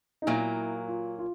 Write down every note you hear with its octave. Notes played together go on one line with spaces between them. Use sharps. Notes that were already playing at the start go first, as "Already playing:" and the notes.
D#4
A#2 F#3 A#3 E4
F4
F4